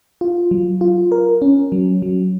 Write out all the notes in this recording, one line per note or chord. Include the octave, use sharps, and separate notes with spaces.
F4
F#3
F4
A#4
C#4
F#3
F#3